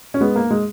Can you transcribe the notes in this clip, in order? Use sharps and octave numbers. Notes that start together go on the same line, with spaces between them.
C#4
G#3 B3
A#3
G#3